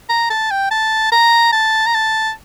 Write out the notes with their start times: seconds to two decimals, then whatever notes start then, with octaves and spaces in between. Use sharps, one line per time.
0.10 A#5
0.30 A5
0.51 G5
0.71 A5
1.12 A#5
1.53 A5
1.87 A#5
1.95 A5